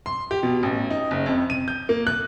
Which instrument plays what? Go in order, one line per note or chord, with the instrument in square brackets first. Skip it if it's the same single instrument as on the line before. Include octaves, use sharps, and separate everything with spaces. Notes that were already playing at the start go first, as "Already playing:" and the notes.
[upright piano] C6
G4
B2
A1
D#4
F#1
F2
D#7
G6
A#3
F#6